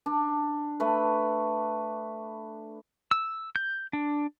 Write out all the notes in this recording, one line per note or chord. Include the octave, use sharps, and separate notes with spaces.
D4
A3 B4
E6
G6
D4